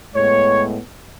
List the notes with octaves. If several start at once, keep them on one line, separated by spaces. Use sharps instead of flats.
A2 G#3 B3 C#5